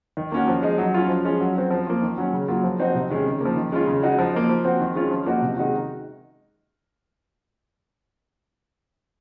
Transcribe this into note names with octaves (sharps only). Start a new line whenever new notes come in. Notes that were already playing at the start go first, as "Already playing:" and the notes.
D#3
A#3 C#4 F#4
F3
G#3 D#4
F#3
C#4 F4
F3
G#3 C#4 F4
F#3
C4 F#4
F3
A#3 F4
D#3
F#3 C#4
C#3
F#3 A#3 F4
F3
C4 D#4 F#4
C3
D#3 G#3 C#4
C#3
F3 A#3
D#3
G#3 C#4 F4
C#3
G#3 D#4 F#4
F3
A#3 D#4
F3
C4 F#4
D#3
G#3 C#4 F4
F3
A#3 D#4 F#4
C3
D#3 G#3 D#4 F#4